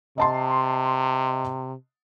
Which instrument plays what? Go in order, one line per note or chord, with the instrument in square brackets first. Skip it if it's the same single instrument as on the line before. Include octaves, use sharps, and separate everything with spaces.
[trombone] C3 [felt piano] D#5 A5 C6